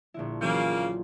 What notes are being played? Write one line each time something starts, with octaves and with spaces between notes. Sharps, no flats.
A#1 D3 E4
C#3 E3 F#3 A#3 F4